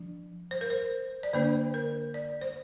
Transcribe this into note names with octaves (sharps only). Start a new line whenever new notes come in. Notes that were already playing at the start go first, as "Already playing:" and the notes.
Already playing: F3 D4
C5
A#4
C5
D5
D3 A#3 D4 C5
A#4
D5
C5